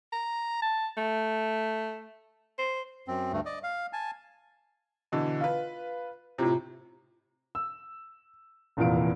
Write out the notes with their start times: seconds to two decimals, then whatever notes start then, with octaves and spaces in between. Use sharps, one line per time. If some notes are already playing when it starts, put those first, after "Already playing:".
0.12 A#5
0.62 A5
0.97 A3
2.58 C5
3.08 F#2 C4
3.32 D2 G2 A3
3.46 D5 D#5
3.64 F5
3.93 G#5 A5
5.12 B2 D3 E3 D#5
5.41 F4 B4 F5
6.38 A2 C3 F4 A#5 G6
7.55 E6
8.77 F1 E2 A#2 E3 F5 D7